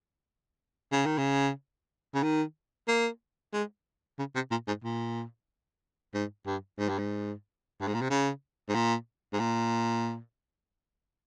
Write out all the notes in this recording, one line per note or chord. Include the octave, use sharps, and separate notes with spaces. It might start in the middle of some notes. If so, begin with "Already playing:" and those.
C#3
D#3
C#3
C#3
D#3
A#3
G#3
C#3
C3
A#2
G#2
A#2
G#2
G2
G#2
G2
G#2
G2
G#2
A#2
C3
C#3
G#2
A#2
G#2
A#2